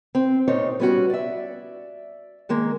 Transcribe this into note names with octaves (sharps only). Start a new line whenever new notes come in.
C4
A#2 D#4 C5 C#5
G3 B3 C#4 D#4 F#4
D5 E5
D#3 G#3 A#3